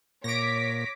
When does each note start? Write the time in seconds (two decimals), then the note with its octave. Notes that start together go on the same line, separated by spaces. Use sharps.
0.24 A#2 C#5 D6 A#6 B6 D7